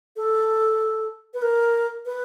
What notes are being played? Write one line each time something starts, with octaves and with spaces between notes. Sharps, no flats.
A4
B4
A#4
B4